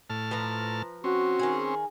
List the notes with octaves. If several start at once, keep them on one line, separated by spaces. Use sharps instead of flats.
A2 A5 F6
F3 B4 A#5
C4 C#4 F#4
D#3 G#4